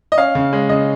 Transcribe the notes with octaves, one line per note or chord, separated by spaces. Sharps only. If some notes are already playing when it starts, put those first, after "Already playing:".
D#5
C#4 F5
C#3
G#3
C#3 D#5